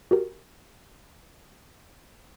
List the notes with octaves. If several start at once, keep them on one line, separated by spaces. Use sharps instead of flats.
F#4 G4 A#4